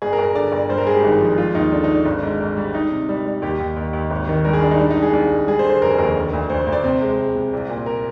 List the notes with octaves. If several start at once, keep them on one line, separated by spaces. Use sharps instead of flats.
G1 G#4
A#4
G1
A#4
D3 D5
G1
G2 C5
A#4
G#3 G#4
G4
G#1 D#4
F3
G#3 F4
D#2 D#4
D3 D4
D3 D#4
D4
G#1
G#2
G#2
G3
G3 D#4
C3
G3
G3
D#2 G4
D#2
D#2
D#2
G#1
D#3
G2 A#4
G#4
G#3 D4
D#4
G3 D4
D#4
C2
G#4
C2
C2
G3 G#4
C5
D3
C5
F1 A#4
G#4
D#2 A#4
D3
D2
D2 C5
C5
D2
D5
C3 C5
G#3
G#3
C3
C2
A#2
A#4